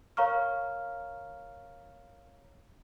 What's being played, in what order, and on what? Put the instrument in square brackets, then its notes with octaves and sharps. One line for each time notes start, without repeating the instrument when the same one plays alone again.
[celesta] A#4 C#5 F5 A#5 C#6 F6